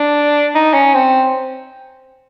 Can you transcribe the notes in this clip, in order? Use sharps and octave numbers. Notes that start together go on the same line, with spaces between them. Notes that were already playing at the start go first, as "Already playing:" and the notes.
Already playing: D4
D#4
C#4
C4